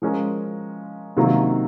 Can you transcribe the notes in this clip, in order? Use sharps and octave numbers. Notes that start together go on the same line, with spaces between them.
F3 G#3 C#4 F4 A#4
C3 D#3 F#3 A#3 F4